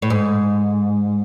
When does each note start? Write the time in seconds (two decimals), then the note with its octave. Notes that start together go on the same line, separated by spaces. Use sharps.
0.02 A2
0.10 G#2